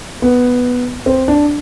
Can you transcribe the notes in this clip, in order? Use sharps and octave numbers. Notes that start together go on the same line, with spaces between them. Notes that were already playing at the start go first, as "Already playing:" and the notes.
B3
C4
D4